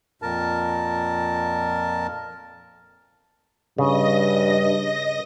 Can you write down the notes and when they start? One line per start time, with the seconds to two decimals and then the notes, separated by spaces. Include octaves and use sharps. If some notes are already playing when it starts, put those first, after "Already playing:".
0.22 F2 A#2 A#4 A5
3.78 G2 C#3 D#5 A#6